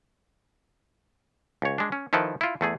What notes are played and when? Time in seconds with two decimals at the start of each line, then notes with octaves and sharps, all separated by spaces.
1.62 C#2 C#5
1.78 G#3 D4
1.92 C#4
2.13 D#3 F3 E4 A4 B4
2.41 E4 F4
2.61 E2 A3 G#4